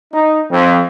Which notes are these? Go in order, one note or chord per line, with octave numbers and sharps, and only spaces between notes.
D#4
F2